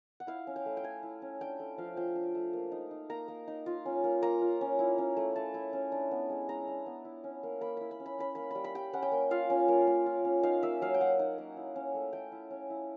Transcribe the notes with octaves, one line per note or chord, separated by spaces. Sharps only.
F#5
E4 F5
C#4
G5
A3
G5
A3 G#5
E4
C#4
D4 G5
A3
F3 F5
F3 G5
D4
A3
A#3
D#4
D#4
A#3 A#5
A#3
D#4
F4
C#4
A#3
A#3 A#5
F4
C#4
E4
C#4
A3
A3 A5
E4
C#4
D4
B3
G#3
G#3 A#5
D4
B3
E4
C#4
A#3
A#3 B5
E4 B5
B5
C#4
B5
C#4 B5
A#3 B5
G3 B5
B5
G3 G5
C#4 F#5
G5
A#3
F4 F5
C#4
A#3
A#3
F4
C#4
D#4 F5
A#3 E5
F#3 F5
G5
F#3 F#5
D#4
A#3
E4
C#4
A3
A3 G5
E4
C#4
E4